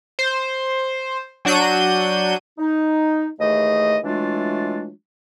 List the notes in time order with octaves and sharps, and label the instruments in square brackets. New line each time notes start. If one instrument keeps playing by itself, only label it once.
[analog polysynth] C5
F#3 D4 F#4 G6 D#7
[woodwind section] D#4
D#2 E3 A3 G#4 D#5
E3 F#3 G#3 A3 D4 F4